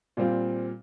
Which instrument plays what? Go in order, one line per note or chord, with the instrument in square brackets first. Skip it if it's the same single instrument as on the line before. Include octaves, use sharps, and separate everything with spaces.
[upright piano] A#2 G3 C4 F4